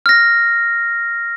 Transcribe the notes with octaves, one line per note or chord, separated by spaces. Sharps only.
F6 A#6